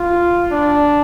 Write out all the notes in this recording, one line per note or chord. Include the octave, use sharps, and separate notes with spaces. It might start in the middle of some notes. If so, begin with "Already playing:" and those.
Already playing: F4
D4